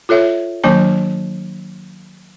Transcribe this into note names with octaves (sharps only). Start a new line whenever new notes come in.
F4 A4 C#5 E5
D#3 F#3 A#3 D4 A5